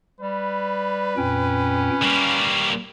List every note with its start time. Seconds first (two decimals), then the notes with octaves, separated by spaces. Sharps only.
0.20 G3 B4
1.17 F2 A#2 C#4 G5
2.02 G3 A#3 C#6